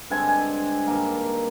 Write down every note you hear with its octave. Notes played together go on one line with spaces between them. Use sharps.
G2 D3 G#3 C4 G#5
G#5
G2 D#3 A#3 D4